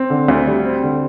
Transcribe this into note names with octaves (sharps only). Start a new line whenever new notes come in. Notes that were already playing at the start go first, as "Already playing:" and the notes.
Already playing: C4
D3
D2
G3
C4
D3